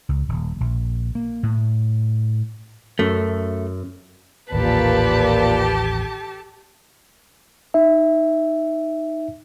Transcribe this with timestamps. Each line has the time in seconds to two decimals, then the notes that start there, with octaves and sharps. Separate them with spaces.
0.09 C#2
0.29 D#1
0.60 A#1
1.15 A#3
1.43 A2
2.99 F#2 A3
4.52 A1 D#2 A#2 G4 A4 B4 A5
7.74 D#4 E5